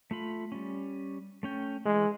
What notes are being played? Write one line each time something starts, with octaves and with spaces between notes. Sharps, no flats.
A3 F4 B5
G3 C#4
A3 C#4 G5
E3 G#3